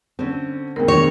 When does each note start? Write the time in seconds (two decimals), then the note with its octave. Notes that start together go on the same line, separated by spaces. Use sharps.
0.19 D3 C4 C#4
0.76 D2 G#2 B2 A#4 G5
0.88 D#3 D4 C#5 A#6